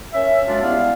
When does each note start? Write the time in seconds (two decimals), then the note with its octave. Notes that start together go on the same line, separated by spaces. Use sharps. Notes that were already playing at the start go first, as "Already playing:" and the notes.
0.14 C#4 A#4 E5
0.47 F#3 G#3 C#4 D4 F4
0.62 G3 B3 E4 F5